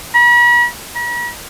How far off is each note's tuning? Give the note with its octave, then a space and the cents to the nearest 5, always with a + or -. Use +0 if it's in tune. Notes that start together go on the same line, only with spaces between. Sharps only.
B5 -45
B5 -45